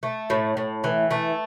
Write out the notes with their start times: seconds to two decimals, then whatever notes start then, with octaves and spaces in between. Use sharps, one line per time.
0.03 A3
0.30 A2
0.57 A2
0.84 E3
1.11 A3